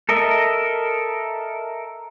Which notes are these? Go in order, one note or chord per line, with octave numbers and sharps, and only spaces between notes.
A4 A#4 D#5 E5